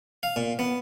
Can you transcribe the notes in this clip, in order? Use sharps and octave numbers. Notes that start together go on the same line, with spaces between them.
F5
A#2
B3